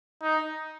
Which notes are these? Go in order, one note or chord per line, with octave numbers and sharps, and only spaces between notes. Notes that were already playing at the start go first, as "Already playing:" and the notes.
D#4